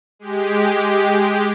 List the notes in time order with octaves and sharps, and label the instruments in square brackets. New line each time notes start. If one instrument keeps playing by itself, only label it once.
[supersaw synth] G#3 G4